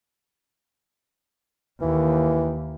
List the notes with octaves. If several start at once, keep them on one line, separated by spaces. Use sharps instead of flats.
D#2 E3